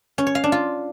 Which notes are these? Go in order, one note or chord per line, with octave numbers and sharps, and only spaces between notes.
C#4
C#5
F5
D4
F4